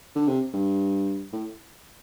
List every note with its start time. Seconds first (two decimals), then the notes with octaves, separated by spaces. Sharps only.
0.15 D3
0.28 C3
0.54 G2
1.33 A2